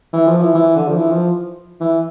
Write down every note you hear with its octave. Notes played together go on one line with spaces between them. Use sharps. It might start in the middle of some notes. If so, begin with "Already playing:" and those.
E3
F3
E3
E3
D3
F3
E3
F3
E3